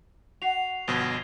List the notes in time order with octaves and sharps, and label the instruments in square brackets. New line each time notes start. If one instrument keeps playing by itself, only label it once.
[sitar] F#4 [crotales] C7 F7
[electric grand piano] G1 B2 [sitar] F3 [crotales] G#6 G7